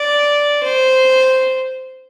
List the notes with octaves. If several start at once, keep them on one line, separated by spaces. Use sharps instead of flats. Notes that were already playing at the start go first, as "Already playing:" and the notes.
Already playing: D5
C5